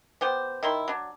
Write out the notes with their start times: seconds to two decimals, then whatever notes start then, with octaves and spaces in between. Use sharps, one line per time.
0.21 B3 G4 C5
0.63 D#3 E4 C6
0.88 F#3 D4